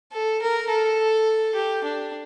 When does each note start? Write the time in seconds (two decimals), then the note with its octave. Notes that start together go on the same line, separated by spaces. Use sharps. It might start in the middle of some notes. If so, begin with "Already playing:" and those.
0.13 A4
0.42 A#4
0.70 A4
1.55 G4
1.84 D4